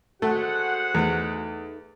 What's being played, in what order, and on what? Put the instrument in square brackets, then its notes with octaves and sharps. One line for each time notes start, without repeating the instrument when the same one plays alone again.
[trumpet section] G#3 C5 F#5 [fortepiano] A3 [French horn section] F#4 [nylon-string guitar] A4
[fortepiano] E2 [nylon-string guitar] A3 D#4